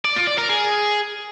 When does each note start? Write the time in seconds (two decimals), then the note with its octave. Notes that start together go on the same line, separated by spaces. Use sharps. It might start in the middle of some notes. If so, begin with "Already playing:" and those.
0.05 D5
0.16 F4
0.27 D5
0.38 A#4
0.49 G#4